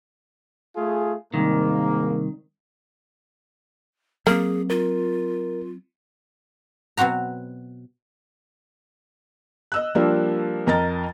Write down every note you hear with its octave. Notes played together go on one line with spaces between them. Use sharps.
A3 F4 G#4
C2 G#2 D#3 A#3
F#3 A#3 C4 G#4
F4 A#4
B2 F#3 C4 F#4 A#5
D#5 E6 F#6
F3 G3 A#3 D4
F2 A#4 D#5 A#5 A6